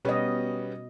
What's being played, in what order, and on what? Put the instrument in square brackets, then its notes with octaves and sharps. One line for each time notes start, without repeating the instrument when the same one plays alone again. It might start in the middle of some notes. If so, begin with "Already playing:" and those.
[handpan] B2 D#5 [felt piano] G3 B3 C#4